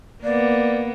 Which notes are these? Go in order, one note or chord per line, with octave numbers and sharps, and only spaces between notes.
A#3 B3 D5